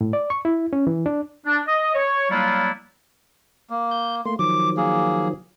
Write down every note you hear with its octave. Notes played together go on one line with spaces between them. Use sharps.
A2
D5
C#6
E4
C#4
E3
D4
D4
D#5
C#5
F#3 G3 A#3 D4 E4 F4
A#3
G6
A3 A#3 C6
D#3 F3 F#3 D6
A#3 G#4